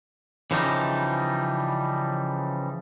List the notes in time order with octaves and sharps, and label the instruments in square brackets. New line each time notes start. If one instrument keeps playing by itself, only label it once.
[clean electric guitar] C#3 E3 F3 G3 D#4